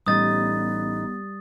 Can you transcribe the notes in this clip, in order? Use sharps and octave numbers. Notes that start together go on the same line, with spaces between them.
A1 G3 B3 D#4 D#6 A6